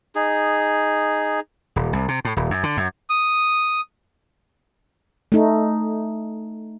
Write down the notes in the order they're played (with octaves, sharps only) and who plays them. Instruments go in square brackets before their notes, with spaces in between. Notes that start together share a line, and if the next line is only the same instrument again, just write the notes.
[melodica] D#4 G#4
[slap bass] D#1
C2
C3
A2
D#1
F#2
D3
F#2
[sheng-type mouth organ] D#6
[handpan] A3 D#4